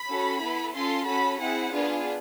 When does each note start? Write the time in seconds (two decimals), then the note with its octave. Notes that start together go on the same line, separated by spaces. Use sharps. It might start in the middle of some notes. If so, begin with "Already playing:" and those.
Already playing: B5
0.08 C#4 F#4 A4
0.41 B3 E4 A4
0.74 C#4 F4 A4 C6
1.07 C#4 F#4 A4 B5
1.40 C4 E4 G#4 F#5
1.73 B3 D4 F4 G#4